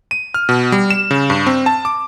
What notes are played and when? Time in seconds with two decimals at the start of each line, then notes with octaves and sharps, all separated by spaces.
0.11 D#7
0.34 F6
0.49 B2
0.72 G3
0.90 E7
1.11 C#3
1.30 G2
1.47 C4
1.66 A5
1.85 D6